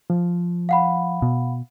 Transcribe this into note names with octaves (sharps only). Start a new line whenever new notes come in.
F3
F5 F#5 B5
B2